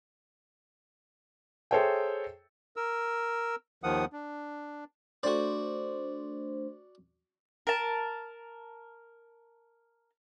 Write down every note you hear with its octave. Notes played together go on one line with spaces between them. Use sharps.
G#4 A4 C5 C#5 E5 G5
A#4 E6
D#2 D#3 F3 F#5 D#6
D4
A3 D4 F#4 C5 D5
A#4 A5